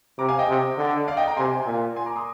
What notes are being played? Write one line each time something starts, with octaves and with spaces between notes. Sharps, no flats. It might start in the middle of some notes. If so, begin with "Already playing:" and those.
C3 A#5 D6
F5 G#5
D#5 G5
C3
D3
D5 F5
D#5 G5
G5 A#5
C3 G#5 C6
A#2
G#5 C6
A#5 D6
C6 D#6